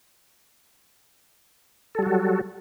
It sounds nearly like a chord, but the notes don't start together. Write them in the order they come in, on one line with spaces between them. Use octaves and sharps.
A4 G3 F#4 F#3